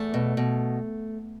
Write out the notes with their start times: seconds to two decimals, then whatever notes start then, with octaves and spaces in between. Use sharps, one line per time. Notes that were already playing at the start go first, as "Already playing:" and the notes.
Already playing: E2 A3
0.14 B2
0.37 B2